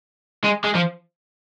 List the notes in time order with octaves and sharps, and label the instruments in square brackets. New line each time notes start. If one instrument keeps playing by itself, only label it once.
[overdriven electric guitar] G#3
G#3
F3